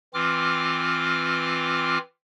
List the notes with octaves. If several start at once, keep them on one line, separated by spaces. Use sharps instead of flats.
E3 C4 F4 D6 F6